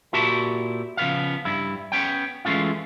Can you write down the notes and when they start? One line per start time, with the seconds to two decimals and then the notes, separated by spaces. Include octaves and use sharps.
0.13 A#2 E4 F#4 G4 A5
0.97 C#3 F3 B3 F5
1.45 G2 E4
1.92 B3 C#4 G5
2.45 E3 G#3 A3 C#4 F4